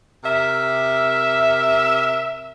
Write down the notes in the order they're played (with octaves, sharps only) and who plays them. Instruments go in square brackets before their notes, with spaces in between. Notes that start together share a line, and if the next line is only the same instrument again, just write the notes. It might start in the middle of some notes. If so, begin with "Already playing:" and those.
[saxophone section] C3 A#4 E5